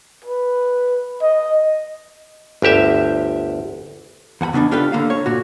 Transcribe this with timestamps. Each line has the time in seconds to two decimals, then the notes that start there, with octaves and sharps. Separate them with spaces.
0.25 B4
1.22 D#5
2.62 G1 D2 G4 E5
4.41 E2 F#5 G#5 B5
4.53 C#3 B3 C4 D4 D#4
4.71 D4 F4 G4 A4 B4
4.92 D3 A#3 F5
5.10 C#5
5.26 A#2 F#4